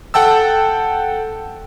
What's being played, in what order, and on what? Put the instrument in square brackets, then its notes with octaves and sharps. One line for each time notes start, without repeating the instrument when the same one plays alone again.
[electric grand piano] A4 F#5 G5 A5 E6